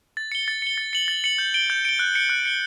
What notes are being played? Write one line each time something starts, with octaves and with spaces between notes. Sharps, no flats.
A6
C#7 G7
A6
C#7 G7
A6
C#7 F#7
A6
C#7 F#7
G6
D7 G7
G6
D7 G7
F#6
C#7 G7
F#6
C#7 G7